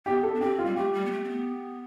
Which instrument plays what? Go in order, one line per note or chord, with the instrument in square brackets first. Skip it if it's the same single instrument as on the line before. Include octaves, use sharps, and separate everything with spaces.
[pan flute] B3 [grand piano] G4
[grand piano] A4
[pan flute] D4
[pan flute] C4 [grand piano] G4
[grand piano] F4
[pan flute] G3
[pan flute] A3 [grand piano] G4
[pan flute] G3
B3
A3
C4
B3